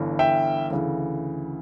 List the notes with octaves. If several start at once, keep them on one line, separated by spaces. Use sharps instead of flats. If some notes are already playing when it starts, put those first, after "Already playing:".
Already playing: G1 G2 E3
E5 G5
D2 C#3 E3